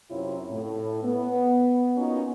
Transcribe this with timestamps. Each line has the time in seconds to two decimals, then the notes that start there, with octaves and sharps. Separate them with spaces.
0.10 F#2 C3 E4 F4 C#5
0.50 A2
1.03 B3
1.97 A#3 B3 C#4 D#4 F4 F#4